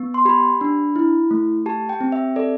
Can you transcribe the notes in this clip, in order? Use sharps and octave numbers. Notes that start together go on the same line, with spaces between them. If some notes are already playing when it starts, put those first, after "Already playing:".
Already playing: B3
C6
G4 B5
D4
E4
A3
G4 A5
G5
C4
E5
A4 D5